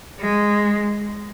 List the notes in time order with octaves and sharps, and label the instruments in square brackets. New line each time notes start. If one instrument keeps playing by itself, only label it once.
[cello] G#3